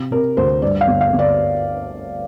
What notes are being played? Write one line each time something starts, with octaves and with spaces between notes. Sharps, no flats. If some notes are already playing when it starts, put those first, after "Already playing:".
Already playing: C3
C3 A#4
D2 C5
G2 D5
F5
G1
F5
G1
D5